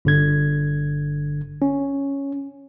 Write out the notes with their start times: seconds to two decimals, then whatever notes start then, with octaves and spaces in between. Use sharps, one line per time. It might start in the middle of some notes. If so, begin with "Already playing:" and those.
0.05 G1 D3 G#6
1.62 C#4